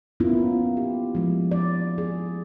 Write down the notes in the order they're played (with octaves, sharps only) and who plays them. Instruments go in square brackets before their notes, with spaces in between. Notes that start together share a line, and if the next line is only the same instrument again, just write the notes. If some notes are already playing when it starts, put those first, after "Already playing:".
[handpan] A#3 B3 C#4 E4 F4
G4
F3 G#3
D5
G#4